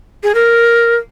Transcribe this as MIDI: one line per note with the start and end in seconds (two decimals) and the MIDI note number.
0.23 0.32 68
0.35 0.96 70